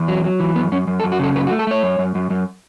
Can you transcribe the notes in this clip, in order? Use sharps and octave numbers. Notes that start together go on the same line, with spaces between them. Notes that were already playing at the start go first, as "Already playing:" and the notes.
Already playing: E2
F#3
F#3
E3
F#2 B3
F#2 C#4
F#2
A4
F#2
F#4
C#3 A4
F#2 B4
F#4
A3
A4
A3 C#5
F#2
F#2
F#2
F#2